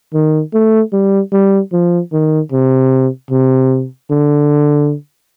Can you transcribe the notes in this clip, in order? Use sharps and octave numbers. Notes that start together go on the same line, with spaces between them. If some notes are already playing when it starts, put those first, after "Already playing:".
D#3
A3
G3
G3
F3
D#3
C3
C3
D3